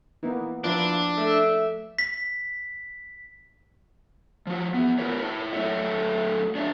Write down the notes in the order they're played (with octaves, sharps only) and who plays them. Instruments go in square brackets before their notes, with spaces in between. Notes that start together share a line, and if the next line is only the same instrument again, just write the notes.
[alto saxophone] E3 [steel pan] A#3 B3 D#4
[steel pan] F3 E4 B4 [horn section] A#3 C4 [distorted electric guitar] D4 [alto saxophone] F4
[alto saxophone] A3 [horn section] E5
[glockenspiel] B6
[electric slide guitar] F3 F#4
E3 B3
F#4 A#4 B4 C#5
E4 C#5
F#3 A3 A4 C#5 E5
D4 C#5 D#5 E5